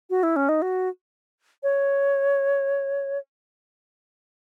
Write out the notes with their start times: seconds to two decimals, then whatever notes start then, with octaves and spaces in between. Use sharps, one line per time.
0.10 F#4
0.23 E4
0.36 C#4
0.49 D#4
0.62 F#4
1.63 C#5